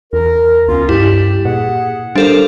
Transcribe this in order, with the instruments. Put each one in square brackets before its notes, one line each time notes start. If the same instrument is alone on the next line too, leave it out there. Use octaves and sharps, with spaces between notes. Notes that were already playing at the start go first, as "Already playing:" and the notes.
[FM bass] E2 [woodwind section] A#4
[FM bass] C#2 [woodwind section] B3 C#4 F4
[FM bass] G2 [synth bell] E4 [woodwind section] G4
[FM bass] A#2 [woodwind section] G#4 F#5
[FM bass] G3 [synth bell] D4 A4 A#4 [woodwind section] G4 C5 F5